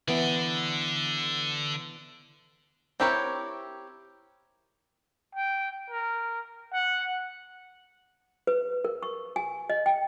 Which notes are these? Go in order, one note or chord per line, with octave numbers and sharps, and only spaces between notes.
D3 E3 B3 D5
C4 E4 G4 A#4 C#5
G5
A#4
F#5
B4
A#4
C#6
G#5
D#5
G5